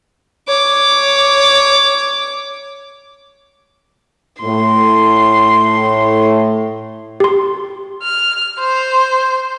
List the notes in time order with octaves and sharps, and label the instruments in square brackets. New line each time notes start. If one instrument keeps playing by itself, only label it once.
[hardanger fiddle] C#5 D6
[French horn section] A2 [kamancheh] C6
[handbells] G4 C6
[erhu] F6
C5